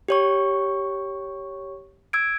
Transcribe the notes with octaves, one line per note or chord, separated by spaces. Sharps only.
G4 C#5 C#6
E6 G#6 D7